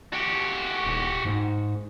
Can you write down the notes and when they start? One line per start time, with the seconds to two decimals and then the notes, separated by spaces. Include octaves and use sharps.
0.13 F#4 G4
0.84 D#1
1.25 G#2